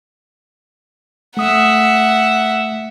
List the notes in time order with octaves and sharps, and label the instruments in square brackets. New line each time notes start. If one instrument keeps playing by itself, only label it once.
[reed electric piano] A3 D#6 [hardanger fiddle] E5 F#5